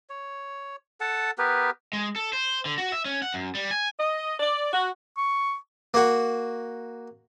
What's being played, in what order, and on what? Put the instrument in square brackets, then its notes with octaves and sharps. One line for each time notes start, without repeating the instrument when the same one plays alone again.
[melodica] C#5
A4 F#5 A5
B3 G4 A#4 B4
[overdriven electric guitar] G#3
A4
C5
D3
F#4
E5
C#4
F#5
F#2
G3
G#5
[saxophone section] D#5
D5
F#4
[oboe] C#6
[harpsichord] A#3 F#4